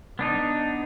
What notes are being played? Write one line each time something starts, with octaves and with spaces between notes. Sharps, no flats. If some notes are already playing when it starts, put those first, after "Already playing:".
B3 D4 D#4